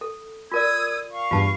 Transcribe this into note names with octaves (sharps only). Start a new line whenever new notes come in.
A4
F4 A#4 D5 D#6 E6 G#6
F5 C#6
E2 G2 F4 A5